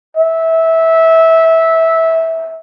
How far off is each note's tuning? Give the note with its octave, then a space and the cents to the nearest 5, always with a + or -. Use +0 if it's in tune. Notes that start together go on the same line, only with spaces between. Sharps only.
E5 -15